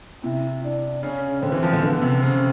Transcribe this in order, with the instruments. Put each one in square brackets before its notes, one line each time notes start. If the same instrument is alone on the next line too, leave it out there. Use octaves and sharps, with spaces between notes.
[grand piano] C3 [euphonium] E4
[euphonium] D4
[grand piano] C#3 [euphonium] C#4
[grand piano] D3 [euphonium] C4
[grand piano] E3
F3
D3
[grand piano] D3 [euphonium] B3
[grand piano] C3
[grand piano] C#3 [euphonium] C4